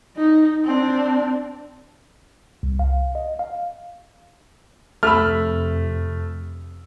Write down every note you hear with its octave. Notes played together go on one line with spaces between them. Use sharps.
D#4
C4 D4
C2
F5
D#5
F5
F2 C3 A3 B5 E6 F6